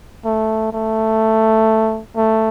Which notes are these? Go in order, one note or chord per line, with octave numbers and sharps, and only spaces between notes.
A3
A3
A3